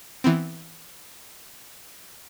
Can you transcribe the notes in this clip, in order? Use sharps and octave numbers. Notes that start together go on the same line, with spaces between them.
E3 B3 C4